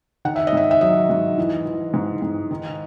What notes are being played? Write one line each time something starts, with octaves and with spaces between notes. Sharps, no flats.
D#3 F#5
E5
D#5
G#2 E5
E5
F#3 D#5
G#2
E3
E3
G#2
G#2
D#3